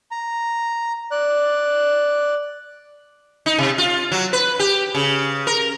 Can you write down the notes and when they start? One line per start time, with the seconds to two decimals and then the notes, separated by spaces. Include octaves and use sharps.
0.11 A#5
1.11 D5 F#6
3.46 D#4
3.58 C3
3.78 F4
4.12 F#3
4.33 B4
4.59 G4
4.95 C#3
5.47 A#4